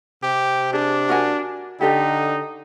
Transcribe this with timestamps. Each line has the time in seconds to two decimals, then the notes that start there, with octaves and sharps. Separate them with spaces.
0.23 C3 G4
0.73 D4 G#4
1.09 F#4 A#4 G#5
1.81 D3 D#4 G4 A4 D#5